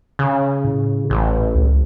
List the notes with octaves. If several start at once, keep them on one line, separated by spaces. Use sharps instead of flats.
C#3
A2
A1
C#2